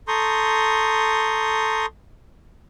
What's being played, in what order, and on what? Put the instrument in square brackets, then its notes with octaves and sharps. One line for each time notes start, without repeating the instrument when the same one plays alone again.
[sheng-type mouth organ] A4 A#5 C6 C#6 D#6 G6